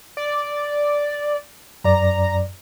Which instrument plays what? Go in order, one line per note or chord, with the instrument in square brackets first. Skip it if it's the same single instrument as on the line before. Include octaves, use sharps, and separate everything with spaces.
[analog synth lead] D5
[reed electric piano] F#2 D5 [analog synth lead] A#5